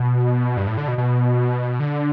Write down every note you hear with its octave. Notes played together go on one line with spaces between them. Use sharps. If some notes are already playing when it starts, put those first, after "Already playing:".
Already playing: B2
G2
A2
D3
B2
B2
D3